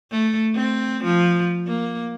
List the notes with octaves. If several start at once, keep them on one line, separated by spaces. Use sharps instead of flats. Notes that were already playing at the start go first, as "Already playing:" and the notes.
A3
C4
F3
A#3